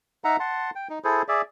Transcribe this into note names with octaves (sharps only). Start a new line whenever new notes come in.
D#4 E5 F#5 A#5
F#5 A5 C6
G5
D#4
E4 G#4 A4 C5
G#4 D5 E5